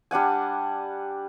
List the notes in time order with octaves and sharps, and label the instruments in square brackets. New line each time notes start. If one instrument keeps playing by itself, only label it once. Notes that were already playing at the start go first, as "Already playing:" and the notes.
[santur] G3 D4 F#5 G#5